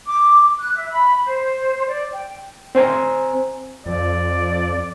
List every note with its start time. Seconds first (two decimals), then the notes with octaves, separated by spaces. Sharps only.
0.06 D6
0.60 F#6
0.75 E5
0.90 B5
1.25 C5
1.87 D5
2.13 G5
2.75 C4 C5 G#5 A#5
3.86 F2 D5